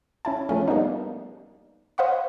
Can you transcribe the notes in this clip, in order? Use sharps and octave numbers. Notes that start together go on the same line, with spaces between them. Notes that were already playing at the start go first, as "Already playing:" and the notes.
C#4 E4 A5
F3 A3 C#4
G3 A#3 B3 D4 D#4
C5 D#5 F5 F#5 B5 C#6